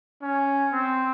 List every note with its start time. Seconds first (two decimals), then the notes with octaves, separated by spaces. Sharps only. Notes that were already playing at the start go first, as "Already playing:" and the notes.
0.22 C#4
0.72 C4